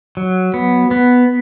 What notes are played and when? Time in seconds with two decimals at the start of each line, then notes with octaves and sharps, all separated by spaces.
0.17 F#3
0.54 B3
0.91 B3